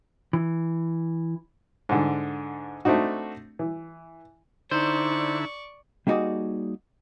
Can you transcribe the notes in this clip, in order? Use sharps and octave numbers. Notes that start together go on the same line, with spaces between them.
E3
G#2 D3
A3 C4 D4 D#4 F#4
E3
D3 D#4 E4 C5 D5 C#6
G3 A#3 D#4 F#4 G#4 D5